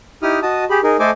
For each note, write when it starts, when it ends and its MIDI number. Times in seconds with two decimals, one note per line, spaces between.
0.22 0.40 63
0.22 0.40 64
0.22 0.40 67
0.22 0.40 87
0.22 0.40 89
0.42 0.64 66
0.42 0.64 75
0.42 0.64 81
0.42 0.64 87
0.70 0.80 67
0.70 0.80 68
0.70 0.80 83
0.83 0.97 63
0.83 0.97 68
0.83 0.97 70
0.99 1.11 57
0.99 1.11 69
0.99 1.11 72
0.99 1.11 75
0.99 1.11 80
0.99 1.11 86